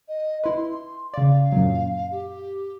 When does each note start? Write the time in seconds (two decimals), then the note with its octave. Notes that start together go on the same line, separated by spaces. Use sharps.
0.08 D#5
0.44 E4 B4 C6
1.14 C#3 D5 F5
1.52 F#2 A#2 F#3
2.11 G4